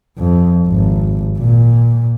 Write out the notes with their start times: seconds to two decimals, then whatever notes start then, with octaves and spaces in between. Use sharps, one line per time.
0.19 F2
0.68 G#1
1.39 A#2